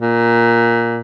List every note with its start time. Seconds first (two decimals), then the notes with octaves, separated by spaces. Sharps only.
0.01 A#2